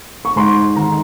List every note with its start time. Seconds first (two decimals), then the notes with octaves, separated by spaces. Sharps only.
0.25 C#6
0.36 G#2 C6
0.76 D#3 A#5